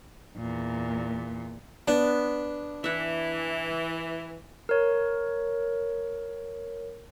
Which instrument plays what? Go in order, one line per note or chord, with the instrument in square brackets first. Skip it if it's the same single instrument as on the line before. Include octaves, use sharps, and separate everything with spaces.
[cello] E2 A#2
[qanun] B3 [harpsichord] D4
[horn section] E3 [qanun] E5 F#5
[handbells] A#4 C#5